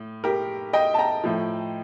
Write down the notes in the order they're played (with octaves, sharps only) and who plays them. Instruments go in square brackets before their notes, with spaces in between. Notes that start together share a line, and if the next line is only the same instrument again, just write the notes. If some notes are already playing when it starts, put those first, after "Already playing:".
Already playing: [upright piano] A2
G4 A#4
D#5 G5
A5
G5 A#5
A2 F3